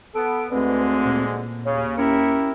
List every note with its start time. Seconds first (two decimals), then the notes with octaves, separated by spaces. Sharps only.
0.15 B3 A4 D7
0.51 D2 G#2 D3 G#3 C4 B4
1.05 A#2
1.65 D#2 C#3 C#5
1.97 C#4 E4 G4 A#4 C#7